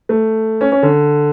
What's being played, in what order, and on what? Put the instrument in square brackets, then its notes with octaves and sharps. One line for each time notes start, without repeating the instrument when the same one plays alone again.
[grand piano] A3
C#4
C#4
D3